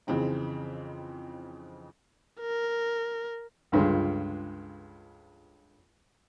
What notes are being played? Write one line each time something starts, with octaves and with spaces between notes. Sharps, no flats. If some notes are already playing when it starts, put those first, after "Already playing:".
F2 C#3 E3 C4 D#4
A#4
C#2 G2 D3 F3 G#3